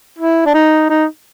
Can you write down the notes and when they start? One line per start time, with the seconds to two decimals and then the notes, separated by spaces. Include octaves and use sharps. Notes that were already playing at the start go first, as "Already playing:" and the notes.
0.19 E4
0.46 D4
0.54 D#4
0.89 D#4